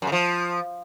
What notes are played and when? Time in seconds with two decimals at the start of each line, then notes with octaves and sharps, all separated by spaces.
0.02 F#2
0.07 C#3
0.12 F3